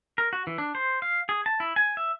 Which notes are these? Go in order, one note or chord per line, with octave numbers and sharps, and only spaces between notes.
A#4
F#4
E3
D4
C5
F5
G#4
A5
E4
G#5
E5